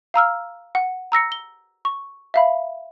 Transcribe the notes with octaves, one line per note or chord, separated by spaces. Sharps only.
F5 A#5 E6 F6
F#5
A#5 E6 A#6 C#7
G7
C#6
E5 F5 B5